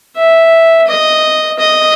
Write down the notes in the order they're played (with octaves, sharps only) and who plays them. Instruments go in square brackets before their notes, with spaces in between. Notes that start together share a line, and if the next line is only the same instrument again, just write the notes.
[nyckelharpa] E5
D#5
D#5